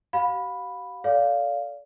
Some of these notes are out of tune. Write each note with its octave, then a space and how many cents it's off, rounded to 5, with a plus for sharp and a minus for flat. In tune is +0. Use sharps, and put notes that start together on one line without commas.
G4 -45 F5 +35 B5 +0
A4 +0 D5 -35 F5 +0